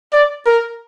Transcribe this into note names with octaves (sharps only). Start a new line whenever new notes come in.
D5
A#4